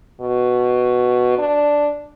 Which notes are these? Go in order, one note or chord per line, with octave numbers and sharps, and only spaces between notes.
B2
D4